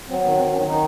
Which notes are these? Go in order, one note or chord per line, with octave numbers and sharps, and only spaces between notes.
F#3 C4
D#3 B3
D#3 C4
D#3 C#4
D#3 D#4